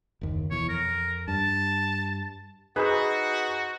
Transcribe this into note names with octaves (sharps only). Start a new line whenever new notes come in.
F#1 D#2
B2 E3 C#5
F2 A#4
G2 A5
D#4 F#4 G#4 B4 C5 E6